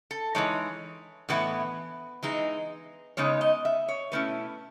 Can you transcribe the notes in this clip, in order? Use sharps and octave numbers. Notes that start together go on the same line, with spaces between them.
A4
E3 G#3 D#4 C#5
A2 E3 B3 E4 B4
E3 G#3 D#4
C#3 G#3 B3 D#4 C#5
D#5
E5
C#5
B2 A3 C#4 E4 B4